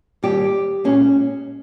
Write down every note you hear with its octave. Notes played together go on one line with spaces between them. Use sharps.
D#2 D#3 G3 G4
A#2 G#3 C#4